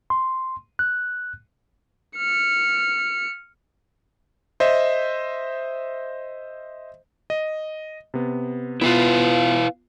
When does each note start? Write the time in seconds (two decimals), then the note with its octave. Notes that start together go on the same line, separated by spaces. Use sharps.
0.10 C6
0.79 F#6
2.17 F6 C#7
4.60 C5 D#5 E5
7.30 D#5
8.14 C3 B3
8.81 B3 E4 F4 B4 F5